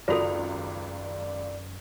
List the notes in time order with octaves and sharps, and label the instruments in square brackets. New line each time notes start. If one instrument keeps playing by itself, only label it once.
[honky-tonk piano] G#1 C#2 F7 [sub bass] F#2 [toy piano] F4 F#4 A4 [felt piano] D5